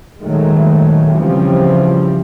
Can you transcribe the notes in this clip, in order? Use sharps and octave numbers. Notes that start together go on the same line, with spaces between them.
A#2 D#3 F#3 G#3 A3
C#3 E3 F3 G3 C4